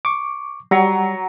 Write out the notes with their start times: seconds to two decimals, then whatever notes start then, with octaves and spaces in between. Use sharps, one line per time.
0.05 C#6 D6
0.71 F#3 G3 A#5 C#6